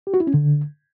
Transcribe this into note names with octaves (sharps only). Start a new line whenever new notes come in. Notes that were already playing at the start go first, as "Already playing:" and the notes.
G4
F#4
E4
C#4
D3